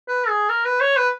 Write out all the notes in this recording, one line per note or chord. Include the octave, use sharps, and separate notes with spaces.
B4
G#4
A#4
B4
C#5
B4